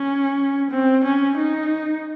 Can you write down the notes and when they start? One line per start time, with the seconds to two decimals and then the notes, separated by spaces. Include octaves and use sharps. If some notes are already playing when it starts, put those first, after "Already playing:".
Already playing: C#4
0.70 C4
1.04 C#4
1.38 D#4